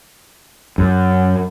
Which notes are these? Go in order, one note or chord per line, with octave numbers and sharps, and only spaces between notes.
F#2